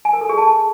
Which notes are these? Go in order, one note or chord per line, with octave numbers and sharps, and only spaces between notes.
G#5
A#4
A4
G#4
A5